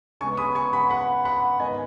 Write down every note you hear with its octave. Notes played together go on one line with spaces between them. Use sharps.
C#3 G#3 B3 G#5 C#6
B5 D#6
G#5 C#6
F#5 B5
F#5 B5
F#5 B5
G#2 D#3 B3 D#5 G#5